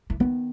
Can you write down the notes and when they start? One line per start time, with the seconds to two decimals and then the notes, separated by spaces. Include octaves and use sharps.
0.10 E3
0.20 D#3 B3